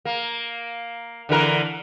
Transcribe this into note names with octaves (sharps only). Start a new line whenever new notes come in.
A#3
D3 E3 A#4